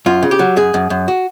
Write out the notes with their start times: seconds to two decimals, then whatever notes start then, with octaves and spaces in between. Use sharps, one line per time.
0.06 F#2 F4
0.23 C#3
0.31 G4
0.39 F#3
0.57 F#2 G#4
0.74 F#2
0.90 F#2
1.08 F#4